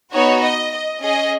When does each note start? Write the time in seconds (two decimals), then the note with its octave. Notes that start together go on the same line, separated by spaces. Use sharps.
0.13 B3 D#4 F#4 C#5
0.41 D#5
0.72 D#5
1.00 C#4 G#4 D#5